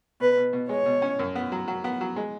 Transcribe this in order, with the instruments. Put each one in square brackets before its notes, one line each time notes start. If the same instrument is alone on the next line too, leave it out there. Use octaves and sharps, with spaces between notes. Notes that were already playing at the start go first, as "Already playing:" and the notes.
[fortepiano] B2 [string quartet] B4
[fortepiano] B2
B2
[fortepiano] G#3 [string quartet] C#5
[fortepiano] B2
C#4
F#2
B3
F#3
F#3
B3
F#3
G#3